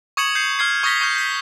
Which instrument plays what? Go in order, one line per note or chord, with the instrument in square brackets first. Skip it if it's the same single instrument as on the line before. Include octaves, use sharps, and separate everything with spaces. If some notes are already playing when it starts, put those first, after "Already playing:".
[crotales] C#6 D#6 G#6 C#7 E7 F#7
D#6 G6 C7 C#7
C#6 F6 G#6 C7
C#6 D#6 G#6 A#6 B6 G7
C#6 F6 G6
G6 B6